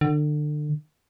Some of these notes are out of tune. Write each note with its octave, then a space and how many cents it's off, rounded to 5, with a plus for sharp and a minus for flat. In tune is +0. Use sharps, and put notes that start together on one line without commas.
D3 +30